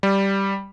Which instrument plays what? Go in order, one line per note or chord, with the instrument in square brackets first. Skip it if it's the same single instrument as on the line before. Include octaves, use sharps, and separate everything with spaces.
[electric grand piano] G3